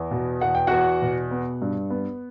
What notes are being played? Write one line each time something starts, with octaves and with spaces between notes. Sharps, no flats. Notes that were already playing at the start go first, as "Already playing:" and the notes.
Already playing: E2
B2
E2 F#5
G5
E2 F#4 F#5
B2
B3
G2
B3